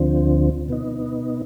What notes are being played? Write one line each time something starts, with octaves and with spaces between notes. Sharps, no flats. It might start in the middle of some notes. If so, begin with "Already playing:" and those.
Already playing: D2 D3 F3 C4
B2 B3 D#4